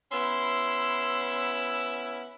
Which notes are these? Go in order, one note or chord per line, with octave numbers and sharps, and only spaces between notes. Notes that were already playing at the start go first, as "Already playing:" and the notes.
B3 C#4 E4 C6 E6